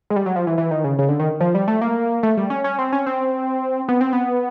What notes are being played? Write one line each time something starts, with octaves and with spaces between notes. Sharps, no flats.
G#3
G3
F#3
F3
E3
E3
D#3
C#3
C#3
D3
D#3
F3
G3
A3
A#3
A3
G3
C#4
C#4
C4
C#4
C4
B3
C4
B3